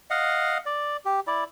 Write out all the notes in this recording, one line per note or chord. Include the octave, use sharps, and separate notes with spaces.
D#5 F5 F#5
D5
G4
E4 D5